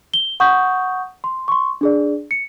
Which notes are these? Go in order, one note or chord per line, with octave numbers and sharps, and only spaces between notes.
G7
F#5 C#6 D#6 G6
C6
C6 C#6
D4 G#4 D5
C#7